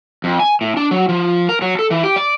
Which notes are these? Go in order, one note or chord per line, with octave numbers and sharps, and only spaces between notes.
F2
G#5
A2
D4
F#3
F3
A#4
F#3
A4
E3
G4
D5